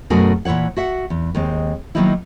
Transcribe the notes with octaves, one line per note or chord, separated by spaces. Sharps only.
F#2 B2 A3 F#4 G#4 A#4
A#2 E3 E4 C#5 F#5
F#4 E5 F#5
E2
D#2 G#3 C4
D#3 F#3 A#3 B3 D#4 E4